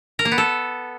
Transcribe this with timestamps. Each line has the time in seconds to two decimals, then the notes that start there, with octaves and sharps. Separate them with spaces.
0.19 A#4
0.25 A#3
0.32 B3
0.38 A4